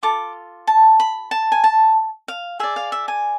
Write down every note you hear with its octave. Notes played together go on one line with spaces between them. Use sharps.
F4 A4 D6
A5
B5
A5
G#5
A5
F5
G#4 D5 E5
F5
E5
G#5